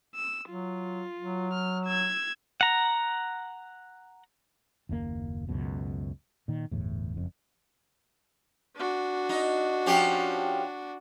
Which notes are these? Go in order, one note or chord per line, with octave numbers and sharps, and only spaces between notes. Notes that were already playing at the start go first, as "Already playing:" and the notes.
E6
F#3 F4
F#3
F6
E6 G#6
F#5 A#5
F#1 D#2 A2 A#3
C#2 F#2 B2
A#2 D#3
G1 E2 A2
F#1 F2
D4 F#4
D#4
F3 C#4 G4